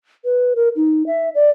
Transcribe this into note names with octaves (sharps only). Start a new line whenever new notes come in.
B4
A#4
D#4
E5
D5